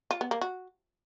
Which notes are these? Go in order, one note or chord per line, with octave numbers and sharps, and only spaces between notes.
F4
B3
A#3
F#4